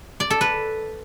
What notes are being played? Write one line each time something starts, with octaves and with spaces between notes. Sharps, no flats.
D5
A4
B4